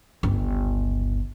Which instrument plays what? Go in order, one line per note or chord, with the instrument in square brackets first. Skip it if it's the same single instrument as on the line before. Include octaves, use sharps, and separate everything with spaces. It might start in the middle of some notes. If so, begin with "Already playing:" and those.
[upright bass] G1 C#2